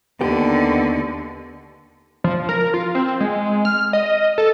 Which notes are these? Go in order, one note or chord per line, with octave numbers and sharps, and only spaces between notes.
D#2 D3 B3 G4
F3
A#4
F4
C4
G#3
F6
D#5
A4